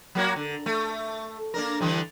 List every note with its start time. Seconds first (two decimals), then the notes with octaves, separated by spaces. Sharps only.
0.15 F#3 A#3 F#4
0.36 D3
0.66 A3
1.54 A#3 D4 A#4
1.81 D3 E3 G3